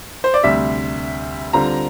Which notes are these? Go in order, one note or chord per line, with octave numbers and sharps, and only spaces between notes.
C5
D5
D2 C3 G3 E5
D3 G3 C4 F4 A#5